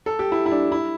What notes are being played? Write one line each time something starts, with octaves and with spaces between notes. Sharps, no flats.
A4
G4
E4
E4
D4
E4